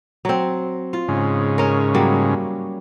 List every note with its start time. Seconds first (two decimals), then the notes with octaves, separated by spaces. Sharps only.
0.25 F#3 C4
0.93 F4
1.08 G#2 C#3
1.58 C#4 A#4
1.94 F#3 G3 A#3